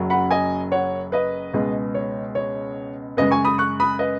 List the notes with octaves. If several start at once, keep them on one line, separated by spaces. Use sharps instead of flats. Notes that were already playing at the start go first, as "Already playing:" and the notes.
Already playing: F#1 F#2 F#3
F#5 B5
D#5 G#5
C#5 F#5
B4 D#5
C#2 B2 G#3
C#5
C#5
F#2 C#3 G#3 B4 D#5
G#5 C#6
B5 D#6
C#6 F#6
B5 D#6
B4 D#5